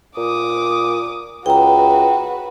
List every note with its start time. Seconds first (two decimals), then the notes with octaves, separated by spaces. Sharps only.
0.17 A#2 D6 D#6
1.46 C#2 F#4 B4 G5 A#5